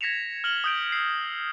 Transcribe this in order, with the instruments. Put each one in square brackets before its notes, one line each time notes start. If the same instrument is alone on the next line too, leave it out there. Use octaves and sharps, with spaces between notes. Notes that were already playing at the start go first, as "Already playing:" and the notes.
[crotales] G#6 A#6 B6 C#7 E7 F7
F6 F#7 G7
D#6 G6 D7
E6 C7